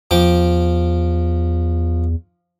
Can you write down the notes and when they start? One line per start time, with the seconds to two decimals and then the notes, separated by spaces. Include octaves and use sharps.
0.11 E2 F3 G5 D6